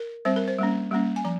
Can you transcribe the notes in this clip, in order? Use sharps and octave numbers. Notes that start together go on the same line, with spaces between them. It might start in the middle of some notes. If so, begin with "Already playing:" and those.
Already playing: A#4
G3 C4 C5
A#4
C5
G3 A#3 C#4
G3 A#3 C#4
G#5
F3 A#5